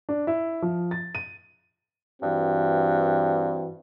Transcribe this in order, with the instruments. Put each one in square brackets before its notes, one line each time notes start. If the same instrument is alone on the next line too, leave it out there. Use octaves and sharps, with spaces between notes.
[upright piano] D4
E4
F3
A6
D#7
[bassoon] G2 [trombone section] E3 C4 F#4